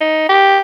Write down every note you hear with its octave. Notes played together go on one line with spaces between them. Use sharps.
D#4
G4